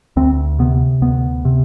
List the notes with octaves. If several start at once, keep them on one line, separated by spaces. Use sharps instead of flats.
D2 C4
C3 B3
D2 B3
C3